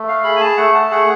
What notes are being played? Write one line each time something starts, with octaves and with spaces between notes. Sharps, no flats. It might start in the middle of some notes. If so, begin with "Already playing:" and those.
Already playing: A3
F5
G#4 B5
G#5
A5
A3 F#5
A5
G#4 F#5